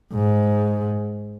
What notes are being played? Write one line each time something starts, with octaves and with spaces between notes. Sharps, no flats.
G#2